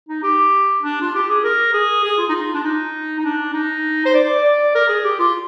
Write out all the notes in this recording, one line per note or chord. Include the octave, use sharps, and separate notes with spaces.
D#4
G4
D4
F4
G4
G#4
A#4
G#4
G#4
F4
D#4
F4
D4
D#4
D#4
D4
D#4
C5
D5
D5
A#4
G#4
G4
F4